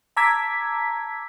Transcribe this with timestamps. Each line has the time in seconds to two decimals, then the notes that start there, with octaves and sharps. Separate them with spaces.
0.17 A5 A#5 D6 E6 G#6 B6